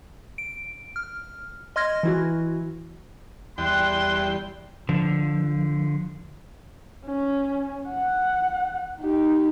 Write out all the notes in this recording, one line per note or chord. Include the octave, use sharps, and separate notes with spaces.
D7
F6
D#5 C6 F6 G#6 A#6
E3 E4 F#4
E2 G3 G5 C6 F#6
D3 F3
C#4
F#5
D#4 G4